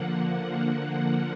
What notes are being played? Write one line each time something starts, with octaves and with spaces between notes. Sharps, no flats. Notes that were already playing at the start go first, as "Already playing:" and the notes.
Already playing: D3 F3 A#3 F#5
F#5